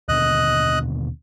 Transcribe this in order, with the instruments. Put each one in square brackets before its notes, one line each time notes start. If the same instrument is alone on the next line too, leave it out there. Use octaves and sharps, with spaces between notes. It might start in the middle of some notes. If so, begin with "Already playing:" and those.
[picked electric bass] D#2 B2 D3 [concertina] D#5 F#6